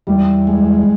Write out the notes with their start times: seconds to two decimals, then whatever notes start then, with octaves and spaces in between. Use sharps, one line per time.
0.07 E2 G3
0.47 G#3